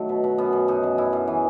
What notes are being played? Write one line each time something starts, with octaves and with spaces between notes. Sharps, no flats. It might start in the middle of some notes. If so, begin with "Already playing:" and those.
Already playing: D#3 F#3 A3
B2
B2
F#2 B3
F#2
F#2 D#4
F#2
F#2 E4
F#2
E3 G#4